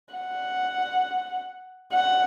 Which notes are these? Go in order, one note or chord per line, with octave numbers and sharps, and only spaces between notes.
F#5
F#5